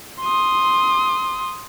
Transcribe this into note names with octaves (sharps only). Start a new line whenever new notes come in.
C6 D#6